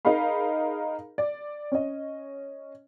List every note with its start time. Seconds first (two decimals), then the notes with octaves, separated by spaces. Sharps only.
0.05 D#4 G#4 A#4 F5 B5
1.18 D5
1.72 C#4 D#5